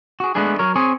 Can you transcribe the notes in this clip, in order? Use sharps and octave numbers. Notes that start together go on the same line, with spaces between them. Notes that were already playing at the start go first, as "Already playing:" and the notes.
F#4 G#4
G#3 A3 B3 D4 G#4
F#3 A#4 C#5
C4 G#4 C#5 G#5